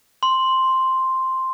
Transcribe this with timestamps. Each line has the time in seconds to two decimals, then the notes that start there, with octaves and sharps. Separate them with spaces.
0.23 C6